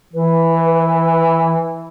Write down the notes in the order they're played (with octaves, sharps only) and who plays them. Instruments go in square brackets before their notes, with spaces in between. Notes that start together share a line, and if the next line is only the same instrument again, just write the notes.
[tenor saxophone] E3 [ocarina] B4